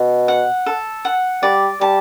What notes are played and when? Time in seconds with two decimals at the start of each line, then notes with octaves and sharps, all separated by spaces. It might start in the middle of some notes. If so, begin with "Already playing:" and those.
Already playing: B2
0.28 F#5
0.66 A4
1.05 F#5
1.43 G3 D5
1.81 G3 A5